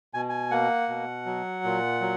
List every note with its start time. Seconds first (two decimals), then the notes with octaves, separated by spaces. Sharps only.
0.14 B2 G#5
0.29 G#5
0.51 A#3 F#5
0.88 B2
1.26 F#3
1.64 A#2
2.01 F#3